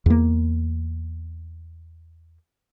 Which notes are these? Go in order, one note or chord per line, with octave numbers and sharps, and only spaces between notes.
E2 A#3